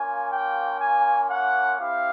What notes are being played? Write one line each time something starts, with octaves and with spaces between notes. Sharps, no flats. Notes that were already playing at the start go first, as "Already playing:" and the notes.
Already playing: A#3 C#4 F4 G#5
G5
G#5
F#5
C4 E4 G4 F5